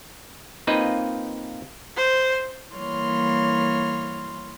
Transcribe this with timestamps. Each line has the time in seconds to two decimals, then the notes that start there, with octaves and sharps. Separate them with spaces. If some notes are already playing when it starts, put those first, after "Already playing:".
0.67 A#3 C4 D#4 F4 B4 D#5
1.96 C5
2.73 E3 G3 A#3 C#5 C6 F6